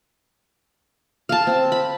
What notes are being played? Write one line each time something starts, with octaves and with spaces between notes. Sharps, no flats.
F5 A5
C4
B5